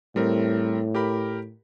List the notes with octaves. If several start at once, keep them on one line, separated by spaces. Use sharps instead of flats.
A2 G3 C4 A#4
G4 A#4 B5